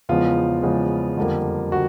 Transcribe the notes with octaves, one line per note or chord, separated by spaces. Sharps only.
E2 C#3 F3 G#3 B3 F4
E2 C#3 F3 G#3 B3
F2 D3 G3 A#3
D3 F#4